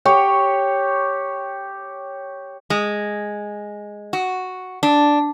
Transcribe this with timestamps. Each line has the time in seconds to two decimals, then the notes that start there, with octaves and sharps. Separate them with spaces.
0.05 G4 C#5
2.70 G#3
4.13 F#4
4.83 D4